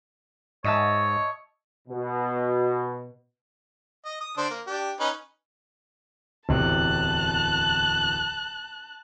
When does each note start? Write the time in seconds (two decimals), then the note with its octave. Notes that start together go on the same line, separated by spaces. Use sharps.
0.64 G#2 C#5 D#5 E5 A5
1.87 B2
4.05 D#5
4.21 D#6
4.37 D3 D4 C5
4.50 A#3
4.67 D4 G4
5.00 C#4 D#4 B4
6.49 D1 E2 C3 A5 F#6